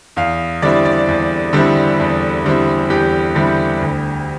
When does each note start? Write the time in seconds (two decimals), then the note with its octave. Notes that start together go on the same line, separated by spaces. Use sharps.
0.16 E2 F5
0.62 D3 G3 C4 E4 D5
0.85 D5
1.08 E2
1.53 D3 G3 C4 E4
2.00 E2
2.45 D3 G3 C4 E4
2.90 E2 G4
3.35 D3 G3 C4 E4
3.81 D2